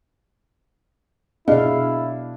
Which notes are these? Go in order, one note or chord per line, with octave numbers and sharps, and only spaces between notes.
B2 D4 E4 G#4 D#5 F5